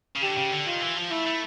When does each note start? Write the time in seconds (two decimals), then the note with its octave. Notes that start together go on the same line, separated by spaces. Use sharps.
0.16 C#3
0.23 D3 G4
0.38 C#3
0.52 D3
0.66 D#3 F4
0.81 E3
0.97 F3
1.11 A3 E4
1.26 A3